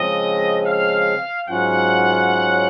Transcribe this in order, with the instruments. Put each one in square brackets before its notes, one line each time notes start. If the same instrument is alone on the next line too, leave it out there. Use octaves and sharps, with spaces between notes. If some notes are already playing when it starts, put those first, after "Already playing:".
Already playing: [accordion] C#3 F3 G#3 C4 [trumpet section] D#5
[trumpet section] F5
[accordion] G#2 F#3 C#4 F4 [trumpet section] F#5